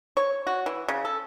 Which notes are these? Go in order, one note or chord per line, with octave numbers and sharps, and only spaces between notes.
C#5
F#4
E3
C#3
A4